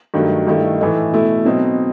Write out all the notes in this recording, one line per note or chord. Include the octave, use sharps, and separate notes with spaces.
G2 D#3 F#3 A3
G2 D#3 A3 E4
A2 E3 A3 D#4
B2 A3 E4
B2 F#3 C4 D#4